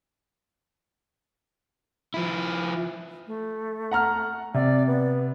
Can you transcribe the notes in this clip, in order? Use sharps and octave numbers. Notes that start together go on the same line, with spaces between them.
F3 E4
A3
F#5 A#5 F6
C3 D5
B3